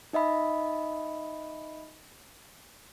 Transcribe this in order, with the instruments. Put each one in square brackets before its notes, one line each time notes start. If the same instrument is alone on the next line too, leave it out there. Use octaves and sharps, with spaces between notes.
[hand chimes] D#4 D#5 E5 B5